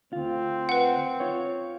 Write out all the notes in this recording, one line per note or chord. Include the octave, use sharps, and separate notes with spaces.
D2 C4 F4
B4 F#5
F4 C#5